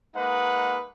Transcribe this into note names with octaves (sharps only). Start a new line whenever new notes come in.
G#3 A#3 D#4 B4 F#5